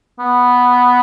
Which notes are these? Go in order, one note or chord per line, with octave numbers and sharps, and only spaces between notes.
B3